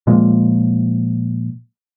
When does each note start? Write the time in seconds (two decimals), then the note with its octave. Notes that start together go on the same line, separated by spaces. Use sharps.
0.07 A#2 F3 G#3 A#3